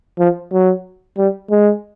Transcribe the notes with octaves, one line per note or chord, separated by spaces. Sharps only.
F3
F#3
G3
G#3